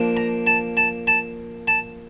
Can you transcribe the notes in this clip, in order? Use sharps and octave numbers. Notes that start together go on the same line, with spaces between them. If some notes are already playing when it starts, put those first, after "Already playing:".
Already playing: F3 A#3 D4
A#5
A5
A5
A5
A5